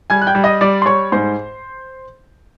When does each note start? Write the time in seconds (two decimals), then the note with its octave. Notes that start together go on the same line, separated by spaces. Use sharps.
0.10 G3 G#5 G#6
0.22 F#6
0.27 G5 G6
0.35 G3
0.44 D#5 D#6
0.61 G3 D5 D6
0.82 C6
0.86 G3 C#5 C#6
1.12 G#2 C5 C6